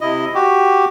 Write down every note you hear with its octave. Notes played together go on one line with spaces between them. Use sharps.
C3 E4 D#5
F#4 G4